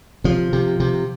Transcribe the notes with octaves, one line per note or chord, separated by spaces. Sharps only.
C3 F3
C3
C3